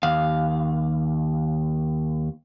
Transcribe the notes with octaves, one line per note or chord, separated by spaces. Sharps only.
D#2 F5